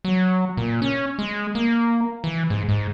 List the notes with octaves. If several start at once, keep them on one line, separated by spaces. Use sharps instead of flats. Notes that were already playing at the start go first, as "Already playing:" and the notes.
F#3
A#2
C#4
G#3
A#3
E3
G#2
G#2